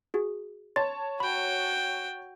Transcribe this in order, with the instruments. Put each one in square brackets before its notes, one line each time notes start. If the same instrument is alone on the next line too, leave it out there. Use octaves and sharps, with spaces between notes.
[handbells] F#4 G#4
[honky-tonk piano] C#5 A5 [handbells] C6 A6
[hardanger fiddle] F#4 G5 [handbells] B5